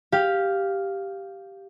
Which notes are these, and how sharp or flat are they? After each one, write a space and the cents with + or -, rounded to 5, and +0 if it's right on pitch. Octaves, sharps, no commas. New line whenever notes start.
G4 +0 F5 +0